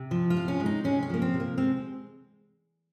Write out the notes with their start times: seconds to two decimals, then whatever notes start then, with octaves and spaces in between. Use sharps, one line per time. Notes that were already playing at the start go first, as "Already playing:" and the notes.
Already playing: C3
0.11 F3
0.30 F4
0.37 C3
0.48 C#4
0.60 G#3
0.66 D#4
0.84 C3 C#4
1.03 C#4
1.10 F3 A#3
1.22 C4
1.34 C3
1.40 A#3
1.58 G#3 C4